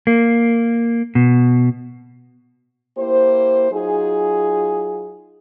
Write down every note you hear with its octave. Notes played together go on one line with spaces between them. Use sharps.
A#3
B2
A#3 E4 G4 C5
F#3 D#4 F4 G#4